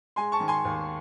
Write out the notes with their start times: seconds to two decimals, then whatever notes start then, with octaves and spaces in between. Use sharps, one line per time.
0.16 G#3 G#5 C6
0.32 A5 C#6
0.40 D#3
0.48 G#5 C6
0.65 D#2